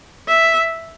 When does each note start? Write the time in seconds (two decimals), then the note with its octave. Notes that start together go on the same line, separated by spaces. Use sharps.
0.28 E5